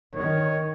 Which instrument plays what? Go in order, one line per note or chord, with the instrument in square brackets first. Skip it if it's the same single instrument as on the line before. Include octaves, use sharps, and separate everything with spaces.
[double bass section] D#3 [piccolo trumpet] C#5